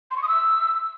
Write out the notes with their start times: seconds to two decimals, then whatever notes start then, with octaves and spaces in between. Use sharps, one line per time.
0.11 C6
0.16 C#6
0.22 D#6
0.28 E6